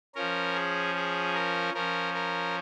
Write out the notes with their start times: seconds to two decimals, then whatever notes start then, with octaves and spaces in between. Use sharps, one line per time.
0.15 F3 C#4 A#4
0.54 G#4
0.95 G#4
1.34 A#4
1.74 F3 C#4 A#4
2.14 A#4